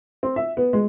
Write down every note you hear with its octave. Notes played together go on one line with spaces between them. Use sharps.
C4
E5
B3
G#3